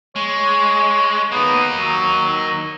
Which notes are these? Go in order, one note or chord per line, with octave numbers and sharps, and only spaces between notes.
G#3 C#5
A#3 B3 D#4
F#3